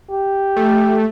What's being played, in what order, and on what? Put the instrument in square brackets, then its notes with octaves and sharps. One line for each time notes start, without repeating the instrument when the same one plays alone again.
[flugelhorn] G4
[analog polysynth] A3